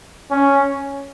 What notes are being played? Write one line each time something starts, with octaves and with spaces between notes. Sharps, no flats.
C#4